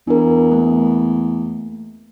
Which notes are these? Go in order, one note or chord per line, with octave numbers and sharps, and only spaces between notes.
E2 D4 A#4
A3 A#3